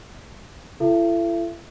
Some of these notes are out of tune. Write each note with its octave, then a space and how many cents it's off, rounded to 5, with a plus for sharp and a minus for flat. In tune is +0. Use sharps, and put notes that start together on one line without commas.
E4 +40 A4 +5 E5 +35